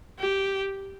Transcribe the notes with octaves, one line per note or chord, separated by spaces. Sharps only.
G4